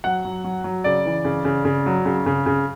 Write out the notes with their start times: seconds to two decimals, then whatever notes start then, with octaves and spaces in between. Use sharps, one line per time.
0.04 F#3 F#5
0.25 F#3
0.44 F#3
0.64 F#3
0.84 C#3 D5
1.05 E3
1.25 C#3
1.45 C#3
1.65 C#3
1.86 F#3
2.05 C#3
2.26 C#3
2.46 C#3